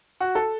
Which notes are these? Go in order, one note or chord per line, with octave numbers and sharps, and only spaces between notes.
F#4
A4